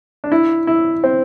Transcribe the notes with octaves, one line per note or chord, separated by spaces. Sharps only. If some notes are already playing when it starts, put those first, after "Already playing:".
D4
E4
E4
C4